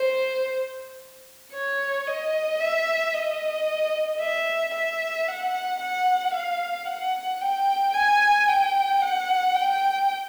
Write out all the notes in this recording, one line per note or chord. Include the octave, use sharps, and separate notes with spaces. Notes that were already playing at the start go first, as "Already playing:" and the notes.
Already playing: C5
C#5
D#5
E5
D#5
E5
E5
F#5
F#5
F5
F#5
G5
G#5
G5
F#5
G5